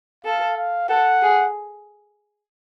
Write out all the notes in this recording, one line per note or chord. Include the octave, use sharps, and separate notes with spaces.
A4 F5
F5
A4 F#5
G#4